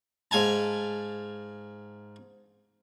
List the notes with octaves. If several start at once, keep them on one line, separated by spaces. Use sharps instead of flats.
G#2 F5 G#5 A5